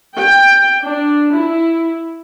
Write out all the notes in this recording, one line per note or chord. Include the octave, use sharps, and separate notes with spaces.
G5
D4
E4